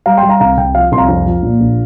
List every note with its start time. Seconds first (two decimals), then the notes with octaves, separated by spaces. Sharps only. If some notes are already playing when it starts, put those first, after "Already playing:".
0.06 G3 F5 A#5
0.17 G5 C6
0.23 G3
0.29 F5 A#5
0.40 C2 F5 A#5
0.58 C2 G5
0.75 F3 F5
0.92 C2 C6
0.98 F5 A#5
1.08 F2
1.26 F3
1.43 A#2
1.60 A#1